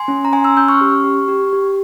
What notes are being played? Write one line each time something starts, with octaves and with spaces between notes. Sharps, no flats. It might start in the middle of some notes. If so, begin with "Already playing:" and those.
Already playing: G#5 C6
C#4
A#5
C#4 G#5 C6
C6 E6
C#4 E6 G6
C#6 F6
G4
G4
G4
G4